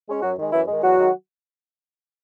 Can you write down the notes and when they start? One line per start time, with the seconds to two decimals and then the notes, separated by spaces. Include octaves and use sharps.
0.09 G#3 C#4
0.22 F#2 F#3 F#4
0.37 D#3 G#3
0.53 F#2 E3 E4
0.67 D#3 G#3
0.83 E2 F#3 F#4
0.98 D#3 G#3